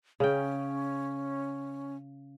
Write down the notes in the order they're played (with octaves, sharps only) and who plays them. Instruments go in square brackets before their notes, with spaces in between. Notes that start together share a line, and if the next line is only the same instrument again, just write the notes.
[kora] C#3 G5 [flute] C#4